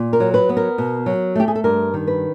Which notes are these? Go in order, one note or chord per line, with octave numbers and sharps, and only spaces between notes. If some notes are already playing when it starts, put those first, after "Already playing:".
Already playing: A#2
A#4
F#3
B4
B3
A#4
B2
F#3
A3 G4
G#4
A4
G2 A#4
D#3
B4